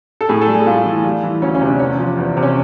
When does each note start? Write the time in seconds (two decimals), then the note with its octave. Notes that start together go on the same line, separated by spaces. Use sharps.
0.21 A4
0.29 A2 G#4
0.42 A4
0.48 G3
0.54 G#4
0.66 A2 F4
0.86 E3
1.04 G3
1.23 E3
1.42 D2 C#4
1.55 C#4
1.61 C3
1.67 D4
1.80 E2 C#4
1.99 F3
2.17 E2
2.37 C3
2.43 C#4